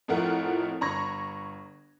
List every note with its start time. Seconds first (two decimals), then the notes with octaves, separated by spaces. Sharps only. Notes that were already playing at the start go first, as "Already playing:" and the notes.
0.08 F2 A2 A3 F4 A#4 F#5
0.81 G1 A#5 B5 C#6 G#6 A#6